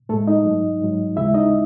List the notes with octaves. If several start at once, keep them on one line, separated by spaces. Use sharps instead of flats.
A2 G#3 A3 A4
D#4 D#5
G#2 F#3
G#2 F#3
D#2 C#3 G#3 E4 E5
D#4 D#5